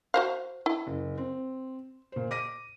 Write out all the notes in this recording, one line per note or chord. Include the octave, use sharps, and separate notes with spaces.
F#4 C5 F5
E4
F#1
C4
A#2 C5
D6 A#6 D#7